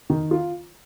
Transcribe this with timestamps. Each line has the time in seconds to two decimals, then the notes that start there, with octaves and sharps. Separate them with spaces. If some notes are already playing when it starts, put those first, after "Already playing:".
0.10 D#3
0.31 F4